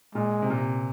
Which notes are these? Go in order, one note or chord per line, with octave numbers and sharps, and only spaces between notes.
A#2 G#3
C3
A#2
C3